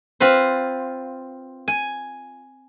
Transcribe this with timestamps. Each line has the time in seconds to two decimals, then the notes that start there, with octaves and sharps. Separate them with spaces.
0.20 C4 F4 B4 C5
1.68 G#5